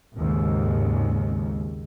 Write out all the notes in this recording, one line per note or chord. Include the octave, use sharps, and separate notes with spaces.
G#1 D#2 G#2 C#3